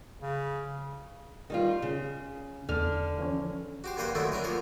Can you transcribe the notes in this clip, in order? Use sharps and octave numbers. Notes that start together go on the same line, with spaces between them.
C#3
D#3 G3 F4
C#3
E2 D3 F6
E3 F3 C#4
F#4 G4 C5
G2 A#3 B4 C5 F#5 G5
D3 D#3 F#3 A3 E4
C#4 D4 A#4 B4
F3 A#3 C5 C#5